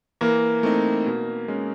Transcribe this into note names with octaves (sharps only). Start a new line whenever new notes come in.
E3 A#3
A3 C4 D#4
B2
G#3 C#4